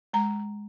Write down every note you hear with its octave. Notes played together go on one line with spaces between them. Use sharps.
G#3 A#5